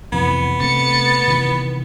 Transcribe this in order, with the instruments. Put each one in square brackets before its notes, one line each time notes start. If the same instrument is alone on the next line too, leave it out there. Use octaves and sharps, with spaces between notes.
[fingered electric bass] F2 C3 E3 [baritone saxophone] B3
[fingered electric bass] C3 A3 [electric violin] A6 C#7
[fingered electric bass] C3 D#3 E3